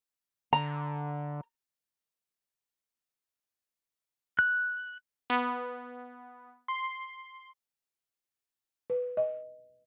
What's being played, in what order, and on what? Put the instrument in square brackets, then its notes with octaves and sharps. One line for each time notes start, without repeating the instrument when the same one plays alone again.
[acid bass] D3 [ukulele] A#5
[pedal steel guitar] F#6
[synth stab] B3
C6
[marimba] B4
D#5